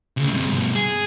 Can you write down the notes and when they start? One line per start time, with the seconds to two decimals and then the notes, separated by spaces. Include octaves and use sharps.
0.17 D2 C#3
0.33 G2 C3
0.51 G2 B2
0.75 G#4